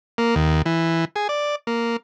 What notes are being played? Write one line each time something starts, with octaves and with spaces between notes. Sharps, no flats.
A#3
D#2
E3
G#4
D5
A#3